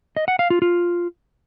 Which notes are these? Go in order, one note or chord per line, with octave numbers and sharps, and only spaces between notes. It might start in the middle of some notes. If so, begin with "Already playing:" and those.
D#5
F#5
F5
F4
F4